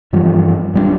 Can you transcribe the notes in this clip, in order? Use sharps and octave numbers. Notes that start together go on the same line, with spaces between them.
G2 E3 F3 G3
D1 G3 B3 D4